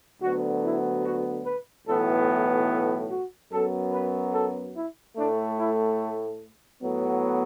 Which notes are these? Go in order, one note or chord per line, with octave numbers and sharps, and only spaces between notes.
D2 D3 F#3 B3 F#4
E4
F#4
B4
B1 A2 E3 B3 A4
A4
F#4
F#2 F#3 B3 A4
B4
A4
E4
A2 A3 D4
E4
A2 F#3 B3